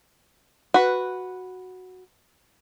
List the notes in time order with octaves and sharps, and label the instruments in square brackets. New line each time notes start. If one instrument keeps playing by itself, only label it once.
[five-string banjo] F#4 B4